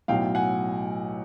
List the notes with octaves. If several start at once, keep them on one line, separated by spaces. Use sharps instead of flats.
B1 A2 F#3 F5 G5
F#5 G#5